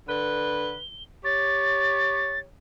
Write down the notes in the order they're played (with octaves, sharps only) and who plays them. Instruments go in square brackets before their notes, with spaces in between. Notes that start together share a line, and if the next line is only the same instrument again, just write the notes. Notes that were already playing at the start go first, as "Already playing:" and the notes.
[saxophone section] D3 B4 [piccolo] G7
[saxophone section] G4 C#5 [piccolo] A6